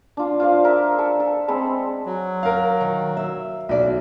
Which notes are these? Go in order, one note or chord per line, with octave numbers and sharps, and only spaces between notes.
D4 F4
F4 C5 D5 F5
A#4 E5
A4
A4
G#3 C4 A4 B5
F#3
A#4 F5
D#3
E5
B1 F#4 D5